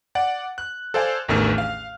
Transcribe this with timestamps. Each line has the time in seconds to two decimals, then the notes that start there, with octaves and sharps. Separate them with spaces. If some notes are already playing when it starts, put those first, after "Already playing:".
0.15 D5 F#5
0.58 F#6
0.94 A4 C5 D5 F5 G#5
1.28 A1 E2 D#3 A3 D4 F6
1.58 F5